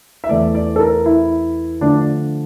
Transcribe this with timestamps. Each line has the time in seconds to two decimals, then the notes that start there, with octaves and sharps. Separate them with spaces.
0.24 E5
0.29 E2 E3 A3 D5
0.55 D5
0.76 A4
0.80 A#4
1.06 E4
1.81 D3 F3 A3 D4